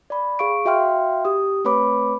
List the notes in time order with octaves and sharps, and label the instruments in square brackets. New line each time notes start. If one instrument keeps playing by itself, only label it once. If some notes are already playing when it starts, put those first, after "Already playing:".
[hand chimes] D5 B5
G#4 F5 C#6 D7
F#4 E5 F5 G5 C6 F6
G4 D#6
A3 C4 B4 C#5 B5 D6